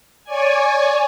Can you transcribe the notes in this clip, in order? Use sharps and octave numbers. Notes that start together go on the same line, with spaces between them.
C#5 D5 G#5